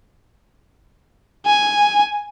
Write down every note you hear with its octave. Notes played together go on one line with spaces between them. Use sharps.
G#5